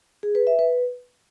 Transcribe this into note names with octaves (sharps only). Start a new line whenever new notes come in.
G#4
B4
E5
B4